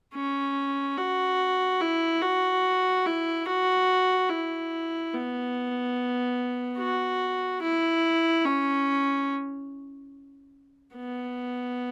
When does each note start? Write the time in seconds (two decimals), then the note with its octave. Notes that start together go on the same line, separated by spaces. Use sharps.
0.14 C#4
0.97 F#4
1.81 E4
2.22 F#4
3.06 E4
3.46 F#4
4.29 E4
5.13 B3
6.79 F#4
7.62 E4
8.45 C#4
10.95 B3